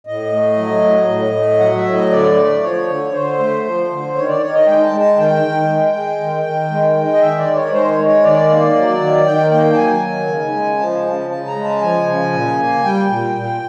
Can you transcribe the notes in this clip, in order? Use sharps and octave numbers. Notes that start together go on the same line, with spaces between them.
A2 D#5
A3
F#3
A2
A2
A3
F#3 F#5
E5
A2
D#5
D3 D5
A3
F3 C#5
D3
D3 C5
A3
F3
D3
D#3 C#5
D5
D#3 C#5
D#5
G#3 G5
A5
G#3
A5
D#3 G5
D#3
G#3
G#3
D#3
D#3
G#3
G#3
D#5
D#3 E5
D5
D#3
C#5
G#3 C5
C#5
G#3
C#5
D#3 D5
A#3
F#3
D#3
D#3 G5
A#3 G5
A5
F#3 G#5
D#3
C#3
G#3
F3 A5
C#3
C#3 A5
A#5
G#3
A5
F3 G#5
C#3
A#2
A#3
G3 G5
A#2
A#2